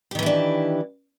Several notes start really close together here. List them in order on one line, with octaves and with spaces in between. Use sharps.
G4 D#3 E3 E4 D4